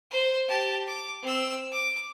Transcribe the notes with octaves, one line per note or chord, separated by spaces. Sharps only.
C5
G4 A5
D6
C4 E6
D6